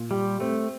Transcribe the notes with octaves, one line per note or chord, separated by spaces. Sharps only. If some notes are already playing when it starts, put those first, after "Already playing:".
Already playing: A#2
G3 G4
A3 C4